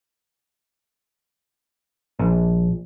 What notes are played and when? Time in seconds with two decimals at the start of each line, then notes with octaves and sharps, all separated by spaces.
2.19 A#1